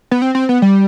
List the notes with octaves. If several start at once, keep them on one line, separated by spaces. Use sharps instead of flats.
B3
C4
C4
B3
G3